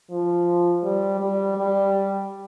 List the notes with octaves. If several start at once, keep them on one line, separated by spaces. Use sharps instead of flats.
F3
G3
G3
G3